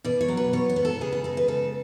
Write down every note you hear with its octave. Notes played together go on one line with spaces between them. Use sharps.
B2 D5
C#5
F#3
B4
B2 C#5
C#5
B3
A4
C#3 G#4
G#4
G#3 A4
B4
C#3 A4